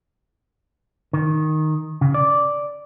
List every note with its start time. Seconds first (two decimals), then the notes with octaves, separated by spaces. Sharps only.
1.13 D#3
2.01 C#3
2.14 D5